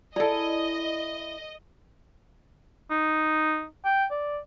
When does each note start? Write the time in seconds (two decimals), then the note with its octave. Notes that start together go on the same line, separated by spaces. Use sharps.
0.16 E4 G#4 A4 D5 D#5 A#5
2.91 D#4
3.85 G5
4.11 D5